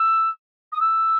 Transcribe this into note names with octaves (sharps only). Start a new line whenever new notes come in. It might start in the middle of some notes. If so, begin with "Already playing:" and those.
Already playing: E6
D#6
E6